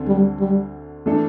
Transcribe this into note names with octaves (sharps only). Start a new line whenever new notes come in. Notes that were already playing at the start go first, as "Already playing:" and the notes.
Already playing: D2 D3 C4 A4
G3
G3
E3 A3 D4 A4